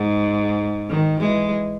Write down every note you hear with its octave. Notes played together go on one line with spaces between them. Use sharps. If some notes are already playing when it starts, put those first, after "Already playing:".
Already playing: G#2
D#3
E3 G#3